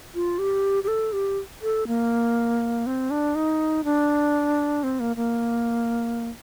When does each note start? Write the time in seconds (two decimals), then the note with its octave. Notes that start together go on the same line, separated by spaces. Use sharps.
0.15 F4
0.39 G4
0.84 G4
0.88 A4
1.13 G4
1.62 A4
1.87 A#3
2.86 C4
3.10 D4
3.35 D#4
3.84 D4
4.83 C4
5.00 A#3
5.16 A#3